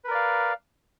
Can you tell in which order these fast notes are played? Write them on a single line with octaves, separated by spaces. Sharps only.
B4 A#4 D5 F5